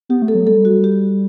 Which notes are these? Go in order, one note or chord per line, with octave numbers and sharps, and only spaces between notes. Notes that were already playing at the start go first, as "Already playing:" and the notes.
B3 G4
A3
A4
F#3
G3 A4
F#4
G4